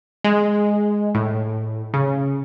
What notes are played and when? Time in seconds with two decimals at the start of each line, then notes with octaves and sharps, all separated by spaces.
0.24 G#3
1.15 A2
1.94 C#3